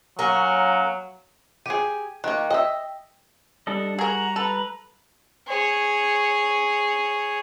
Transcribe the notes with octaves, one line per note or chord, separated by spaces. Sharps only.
F#3 A#3 C#4 A#4
G4 G#4 D#7
D#3 A#3 F#6
D#5 E5 G5
G3 D4 A4 D#5
F#4 G#4 A#4 A#5
A4 B4
G#4 C#5